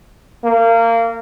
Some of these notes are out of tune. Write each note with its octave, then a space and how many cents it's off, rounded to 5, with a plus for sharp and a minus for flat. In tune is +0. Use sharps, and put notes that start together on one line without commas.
A#3 -25